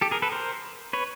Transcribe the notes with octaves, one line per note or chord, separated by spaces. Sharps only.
G4 A4
G#4 A#4
A4 B4
A#4 C5
B4 C#5